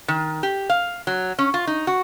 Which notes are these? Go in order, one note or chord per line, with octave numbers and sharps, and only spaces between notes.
D#3
G4
F5
F#3
C#4
F4
D#4
F#4